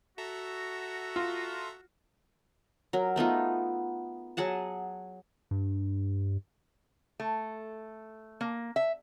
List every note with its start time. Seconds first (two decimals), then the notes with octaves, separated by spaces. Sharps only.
0.18 F#4 A4 E5 A#5
1.16 F4
2.93 F#3 A#4
3.16 A3 B3 D#4 F4
4.37 F#3 G#4 F#5 A5
5.51 G2
7.20 A3
8.41 A#3
8.76 E5